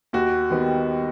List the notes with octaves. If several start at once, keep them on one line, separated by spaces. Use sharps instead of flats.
D#2 F#4
D#3 G3 B3